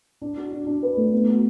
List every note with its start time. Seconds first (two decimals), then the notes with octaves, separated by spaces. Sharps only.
0.22 D4
0.37 F#4
0.52 D4
0.67 D4
0.83 B4
0.97 A3
1.12 B3
1.28 F#4